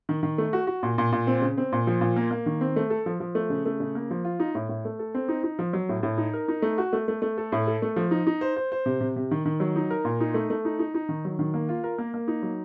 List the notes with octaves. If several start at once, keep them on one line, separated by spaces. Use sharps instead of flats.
D#3
D#3
A3
F#4
F#4
A#2
A#2
A#2
C4
C#3
C4
A#2
F3
A#2
A#3
A#3
D#3
C4
A3
A4
F3
F3
A3
C#3
A3
C#3
A#3
F3
F4
D#4
A2
A2
A3
A4
C4
D#4
D#4
F3
F#3
A2
A2
D#4
A#4
D#4
A3
F#4
A3
A3
A3
A4
A2
A4
A3
F3
D#4
D#4
C5
C5
C5
C3
C3
C3
D#3
D#3
F#3
D#4
A#4
A#2
D#4
A3
A3
D#4
D#4
D#4
D#3
F#3
D#3
A#3
F4
A#4
A#3
A#3
D#4
F#3